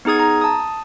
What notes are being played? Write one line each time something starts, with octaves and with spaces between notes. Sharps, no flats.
B3 D#4 G#4 D#6 G#6
A#5
A5 D#6